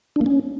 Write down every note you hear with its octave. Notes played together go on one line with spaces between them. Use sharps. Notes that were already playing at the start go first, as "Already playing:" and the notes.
D4
A#3
C#4